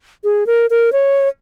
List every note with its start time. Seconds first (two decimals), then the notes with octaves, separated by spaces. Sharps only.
0.24 G#4
0.47 A#4
0.70 A#4
0.92 C#5